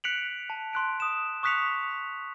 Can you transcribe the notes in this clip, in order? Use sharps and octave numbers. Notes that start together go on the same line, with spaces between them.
F#6 B6 C#7 D7 F7 F#7
A5
C6 F#6 D7
D#6 E7
C#6 D#6 F#6 B6 C#7 F7